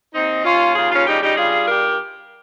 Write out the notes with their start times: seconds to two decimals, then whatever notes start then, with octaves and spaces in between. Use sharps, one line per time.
0.14 D#2 C4 D#4
0.44 D#2 C#4 F4
0.75 C#3 F4 G#4
0.92 C#4 F4
1.07 G3 D#4 G4
1.22 D#4 G4
1.37 G2 F4 G#4
1.68 G2 G4 A#4